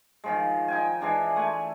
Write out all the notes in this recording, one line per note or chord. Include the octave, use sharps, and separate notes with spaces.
D#3 F3 G#3
D#4 G5 G#5
E3 G#3 D4 G#5
A3 G#5